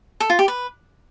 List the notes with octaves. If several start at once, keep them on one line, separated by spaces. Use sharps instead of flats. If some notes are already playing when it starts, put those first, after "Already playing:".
A4
F4
G4
B4